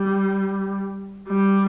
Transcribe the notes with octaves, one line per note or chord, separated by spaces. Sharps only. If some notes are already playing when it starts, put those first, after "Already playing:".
Already playing: G3
G3